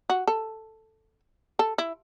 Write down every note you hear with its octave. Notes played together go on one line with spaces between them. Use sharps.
F#4
A4
A4
E4